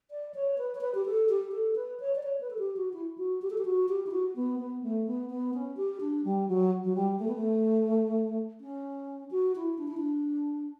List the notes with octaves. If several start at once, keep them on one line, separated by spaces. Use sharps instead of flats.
D5
C#5
B4
C#5
B4
G4
A4
G4
A4
B4
C#5
D5
C#5
B4
A4
G4
F#4
E4
F#4
G4
A4
G4
F#4
G4
E4
F#4
B3
B3
A3
B3
B3
C#4
G4
D4
G3
F#3
F#3
G3
A3
B3
A3
C#4
F#4
E4
D4
E4
D4